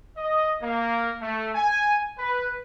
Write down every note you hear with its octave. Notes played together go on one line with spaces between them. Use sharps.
D#5
A#3
A3
G#5
B4